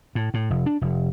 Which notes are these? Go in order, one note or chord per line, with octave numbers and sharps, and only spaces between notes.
A2
A2
F1
D4
F1